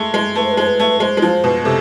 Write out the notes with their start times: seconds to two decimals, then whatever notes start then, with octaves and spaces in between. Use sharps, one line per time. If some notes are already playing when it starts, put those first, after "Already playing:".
Already playing: G#3 A3
0.14 G#3
0.35 A3 B4
0.44 C5
0.52 B4
0.57 G#3 C5
0.67 B4
0.80 A3
1.00 G#3 C5
1.17 G#3
1.22 F3 C5
1.44 B2 B4
1.65 C3 A4